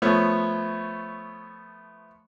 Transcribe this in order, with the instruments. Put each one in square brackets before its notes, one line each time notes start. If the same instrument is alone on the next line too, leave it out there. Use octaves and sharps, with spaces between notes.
[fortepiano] F3 A3 B3 C#5